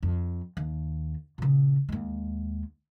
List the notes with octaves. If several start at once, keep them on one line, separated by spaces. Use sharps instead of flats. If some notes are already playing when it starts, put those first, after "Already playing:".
F2
D#2
A#2 C#3
D#2 G#3